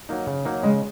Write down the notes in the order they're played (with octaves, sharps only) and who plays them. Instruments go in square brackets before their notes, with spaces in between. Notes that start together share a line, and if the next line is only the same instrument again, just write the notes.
[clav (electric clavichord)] F#3 A#3 D#4
C#3
F#3 A#3 D#4
[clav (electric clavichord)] C#3 [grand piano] G#3